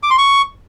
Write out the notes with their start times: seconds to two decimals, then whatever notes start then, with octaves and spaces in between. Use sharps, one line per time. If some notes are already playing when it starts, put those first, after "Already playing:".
0.03 D6
0.10 C6
0.18 C#6